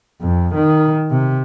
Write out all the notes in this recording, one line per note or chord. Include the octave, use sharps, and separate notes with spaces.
F2
D#3
C3